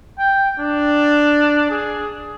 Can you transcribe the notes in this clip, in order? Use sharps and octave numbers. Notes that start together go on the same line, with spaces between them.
G5
D4
G#4